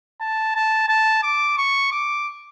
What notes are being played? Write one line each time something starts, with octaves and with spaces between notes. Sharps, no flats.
A5
A5
A5
D6
C#6
D6